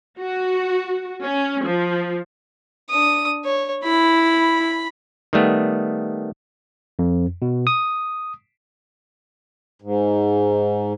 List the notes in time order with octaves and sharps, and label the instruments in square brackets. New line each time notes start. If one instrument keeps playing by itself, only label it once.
[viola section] F#4
C#4
F3
[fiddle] D4 D#6
C#5
[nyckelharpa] E4 [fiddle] B5
[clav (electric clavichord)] D#3 G3 A3 B3
[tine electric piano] F2
B2
D#6
[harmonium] G#2